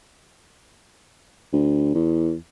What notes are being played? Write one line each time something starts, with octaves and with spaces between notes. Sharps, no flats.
D2
E2